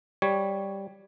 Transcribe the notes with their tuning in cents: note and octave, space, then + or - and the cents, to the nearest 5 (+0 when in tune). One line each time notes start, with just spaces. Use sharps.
G3 +0 C#5 +0